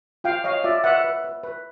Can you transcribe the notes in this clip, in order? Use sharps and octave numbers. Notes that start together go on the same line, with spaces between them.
F4 F5 G5
C#5 D#5 F5
F4 D5 E5
B4 E5 F#5
B4
B4
B4